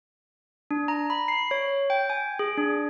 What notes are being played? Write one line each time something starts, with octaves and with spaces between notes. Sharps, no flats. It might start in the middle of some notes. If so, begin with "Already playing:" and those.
D4
A#5
B5
C7
C#5
G5
G#5
G#4
D4